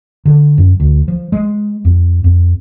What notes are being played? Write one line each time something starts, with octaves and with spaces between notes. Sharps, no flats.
D3
F#2
D2
F3
G#3
F2
F2